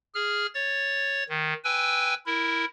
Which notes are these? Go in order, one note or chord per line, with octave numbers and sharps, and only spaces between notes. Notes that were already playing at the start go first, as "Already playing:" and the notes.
G#4 F6
C#5 A6
D#3
B4 G5 G#5 E6
E4 A#4